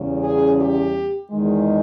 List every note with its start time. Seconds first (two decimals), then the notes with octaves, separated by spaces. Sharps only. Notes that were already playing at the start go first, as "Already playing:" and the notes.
Already playing: E2 C#3 G3 C#4
0.23 G#4
0.59 G4
1.32 E2 D#3 G#3